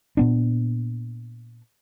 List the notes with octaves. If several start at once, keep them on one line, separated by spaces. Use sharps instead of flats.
A#2 B3 D4